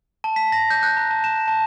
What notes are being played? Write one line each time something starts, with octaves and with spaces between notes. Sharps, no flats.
A5
B6
A#6
G6
F#6
A#5
A5
E7
A5